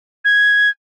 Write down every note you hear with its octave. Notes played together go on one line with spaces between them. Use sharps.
G#6